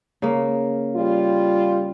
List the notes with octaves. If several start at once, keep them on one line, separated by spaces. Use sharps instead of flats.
C#3 A#3
G3 F4